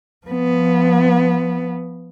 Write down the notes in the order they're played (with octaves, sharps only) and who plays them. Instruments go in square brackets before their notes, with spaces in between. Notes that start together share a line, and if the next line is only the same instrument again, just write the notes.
[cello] F3 B3